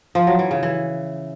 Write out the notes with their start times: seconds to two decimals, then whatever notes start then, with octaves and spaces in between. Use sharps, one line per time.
0.15 F3
0.27 F#3
0.39 E3
0.51 C#3
0.63 E3